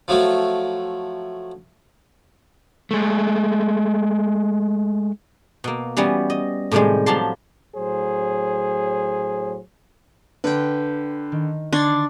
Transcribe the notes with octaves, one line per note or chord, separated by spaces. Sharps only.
F3 F#3 A3
G#3 A3
B2 A#3
E3 G3 B3 C#4
D#5
A2 C3 D#3 G3 G#3
A2 F3 F#3 G4 A5 C6
A2 F#3 G#4 C5
D3 D4 B4 G5
D#3
D3 D4 C6 C#6 G#6 A6